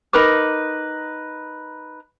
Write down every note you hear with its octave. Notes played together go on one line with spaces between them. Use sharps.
D#4 A#4 B4 D6